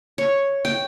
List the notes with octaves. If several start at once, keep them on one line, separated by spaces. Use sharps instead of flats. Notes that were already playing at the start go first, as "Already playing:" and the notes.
C#5
G5